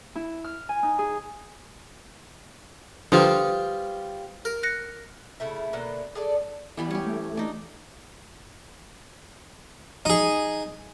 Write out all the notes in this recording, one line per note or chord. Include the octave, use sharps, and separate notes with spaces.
E4
F6
G#5
D#4
G#4
D3 F3 G3 F4 B4 C5 D#6
A#4
F#6 A#6 C#7
C#3 A3 E4
B2 D3 A#3 F#5
G#4 A4 D5
E3 G3 B3 B5
C#4 G4
A3
D4 D#4
D#4 G#4